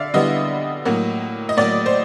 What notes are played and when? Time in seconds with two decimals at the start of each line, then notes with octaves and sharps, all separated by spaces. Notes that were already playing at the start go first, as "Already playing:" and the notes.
Already playing: D3 D5 E5 F5
0.14 D3 G3 B3 E4 D#5
0.85 A2 F#3 A#3
1.49 D#5
1.57 A2 F#3 A#3 D5
1.86 C5